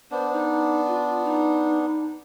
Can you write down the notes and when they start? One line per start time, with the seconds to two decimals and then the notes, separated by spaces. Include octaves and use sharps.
0.11 B3 D4 C5
0.33 D#4
0.87 F4
1.25 D#4